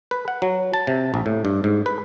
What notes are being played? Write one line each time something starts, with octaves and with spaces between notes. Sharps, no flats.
B4
F#5
F#3
A5
C3
A#1
A2
G2
G#2
B4